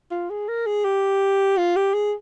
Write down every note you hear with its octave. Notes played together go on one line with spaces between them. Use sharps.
F4
G#4
A#4
G#4
G4
F4
G4
G#4